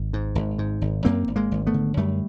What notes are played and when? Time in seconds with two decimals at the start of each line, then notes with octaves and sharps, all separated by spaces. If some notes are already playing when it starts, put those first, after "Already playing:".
Already playing: G#1
0.13 G#2
0.35 G#1
0.58 G#2
0.82 G#1
1.05 F#2 A#3 C4
1.28 G#1
1.36 G#3 A#3
1.51 G#1
1.67 A3 B3
1.74 D3
1.97 F#2 G3 A3